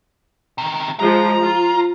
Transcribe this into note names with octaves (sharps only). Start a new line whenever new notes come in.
C3 D#3
F3 G#3 A#5
F4